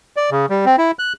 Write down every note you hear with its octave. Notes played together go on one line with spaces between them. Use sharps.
D5
C#3
G3
C4
E4
F#6